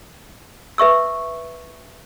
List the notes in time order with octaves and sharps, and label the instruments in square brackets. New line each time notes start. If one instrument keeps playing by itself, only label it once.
[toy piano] B4 E5 C#6 E6